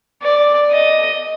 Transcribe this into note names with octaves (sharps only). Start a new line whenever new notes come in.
D5
D#5